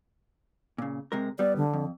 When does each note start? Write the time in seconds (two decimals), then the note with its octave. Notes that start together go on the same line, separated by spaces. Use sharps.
0.78 A#2 C#3
1.12 C3 G#3 A#4
1.39 G3 B3 D5
1.57 D3
1.73 F2